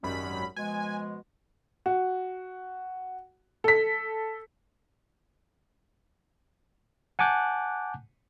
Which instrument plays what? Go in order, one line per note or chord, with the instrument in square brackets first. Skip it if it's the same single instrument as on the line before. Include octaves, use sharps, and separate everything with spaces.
[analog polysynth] G#1 F#2 B5 [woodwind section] G3 G#3 C#4
[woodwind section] B2 F3 G#3 [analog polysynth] G#5
[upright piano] F#4
A4 B6
[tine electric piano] F#5 G#5 A5 D6 F#6 G6